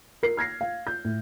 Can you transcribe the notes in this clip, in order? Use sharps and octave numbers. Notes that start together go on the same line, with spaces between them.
A#4 C7
F6 G#6 A#6 C7
F5
G6
A2